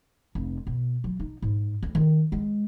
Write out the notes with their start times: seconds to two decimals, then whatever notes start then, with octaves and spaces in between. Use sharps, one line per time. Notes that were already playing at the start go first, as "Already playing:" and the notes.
0.35 F1
0.67 B2
1.04 F#3
1.20 D#4
1.42 G#2
1.83 D2
1.95 D#3
2.32 G#3